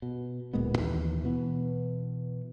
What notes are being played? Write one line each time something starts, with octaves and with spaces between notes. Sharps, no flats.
B2
D1 A#2 G#3 B3
D#2 E3
B2 E3 B3